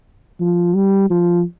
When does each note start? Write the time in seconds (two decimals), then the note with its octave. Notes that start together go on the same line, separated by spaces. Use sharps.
0.40 F3
0.74 G3
1.10 F3